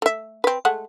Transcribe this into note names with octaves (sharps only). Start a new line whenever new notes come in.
A3 E5
C4 B4
G#3 A3 F#5